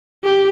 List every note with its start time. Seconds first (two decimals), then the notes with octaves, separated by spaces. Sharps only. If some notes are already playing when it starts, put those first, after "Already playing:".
0.24 G4